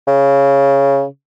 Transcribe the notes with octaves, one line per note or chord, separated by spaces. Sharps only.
C#3